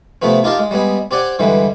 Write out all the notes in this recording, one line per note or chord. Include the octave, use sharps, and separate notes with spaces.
C3 F3 A3 B3 C4
D#4 F4 G4 A#4 F5 A5
G#3
G3 G#3 B3 G#4
C4 G4 D5 F#5 G#5
G2 D3 E3 G3 G#3